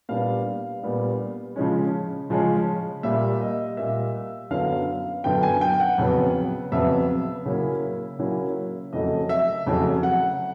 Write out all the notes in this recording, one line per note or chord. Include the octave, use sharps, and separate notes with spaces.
A#2 G3 B3 D4 F5
A#2 G3 B3 D4
C#3 F3 G#3 C#4
C#3 F3 G#3 C#4
A#2 G3 A#3 E5
D#5
A#2 G3 A#3 E5
F#2 D3 F#3 B3 F5
F#2 D3 F#3 B3 G5
G#5
G5
F#5
F2 C#3 F#3 B3
F2 C#3 F#3 B3 E5
C#3 F#3 A#3 C#4 E4
C#3 F#3 A#3 C#4 E4
F2 C#3 F#3 A3 D#5
E5
F2 C#3 F#3 A3
F#5